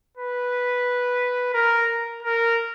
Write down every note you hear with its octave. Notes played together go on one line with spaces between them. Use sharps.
B4
A#4
A#4